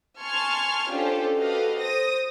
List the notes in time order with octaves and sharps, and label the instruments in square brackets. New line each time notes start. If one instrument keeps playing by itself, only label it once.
[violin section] G#5 A5 C6 C#6 F6 G#6
C#4 D4 F4 G4 A4 C5
F#4 G4 A4 B4 D#5 F5
C5 D#6 A#6